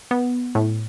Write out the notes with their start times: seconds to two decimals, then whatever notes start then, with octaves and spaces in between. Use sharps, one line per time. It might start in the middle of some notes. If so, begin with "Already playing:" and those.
0.11 B3
0.55 A2